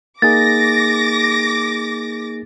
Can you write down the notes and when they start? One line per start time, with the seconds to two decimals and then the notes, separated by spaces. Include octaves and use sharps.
0.22 A#3 D#4 G#4 D6 A6 A#6